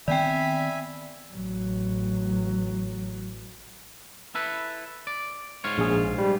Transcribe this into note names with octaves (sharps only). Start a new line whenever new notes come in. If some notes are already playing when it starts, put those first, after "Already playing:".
D#3 B3 C4 D5 E5 G5 G#5 B5
A1 F#3
E4 A4 B4
D5
G#2 F4 C#5
A#1 G#4
G3